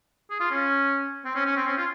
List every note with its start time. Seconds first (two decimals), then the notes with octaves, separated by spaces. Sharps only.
0.30 G#4
0.40 F4
0.51 C#4
1.25 C4
1.35 C#4
1.46 C#4
1.56 C4
1.67 C#4
1.77 F4